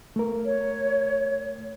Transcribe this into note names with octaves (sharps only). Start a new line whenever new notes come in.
A3 A#4
C#5